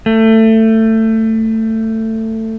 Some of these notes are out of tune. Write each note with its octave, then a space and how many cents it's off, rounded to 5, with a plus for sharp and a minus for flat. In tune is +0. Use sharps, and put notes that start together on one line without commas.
A3 +20